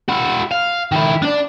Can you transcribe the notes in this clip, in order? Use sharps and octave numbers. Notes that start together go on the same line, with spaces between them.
E4 F#4
F5
D#3 E4
D4 D5